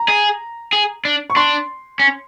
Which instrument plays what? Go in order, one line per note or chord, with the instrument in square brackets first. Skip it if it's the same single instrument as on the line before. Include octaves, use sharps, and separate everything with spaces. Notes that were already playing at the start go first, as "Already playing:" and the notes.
Already playing: [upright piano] A#5
[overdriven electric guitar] G#4
G#4
D4
[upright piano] C#6
[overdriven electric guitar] D4 [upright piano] C6
[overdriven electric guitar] C#4